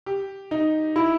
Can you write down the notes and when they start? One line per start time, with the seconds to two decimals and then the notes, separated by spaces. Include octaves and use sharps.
0.06 G4
0.51 D#4
0.96 E4